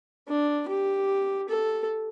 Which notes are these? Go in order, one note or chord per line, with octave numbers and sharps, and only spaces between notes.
D4
G4
A4